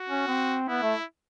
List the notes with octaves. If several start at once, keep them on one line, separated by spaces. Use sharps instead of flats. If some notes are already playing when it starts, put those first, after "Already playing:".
Already playing: F#4
C#4
C4
B3 E4
A3